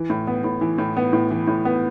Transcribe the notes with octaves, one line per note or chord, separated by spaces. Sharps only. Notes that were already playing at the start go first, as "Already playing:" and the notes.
Already playing: E3
A2
B3
A2
E3
A2
B3
A2
E3
A2
B3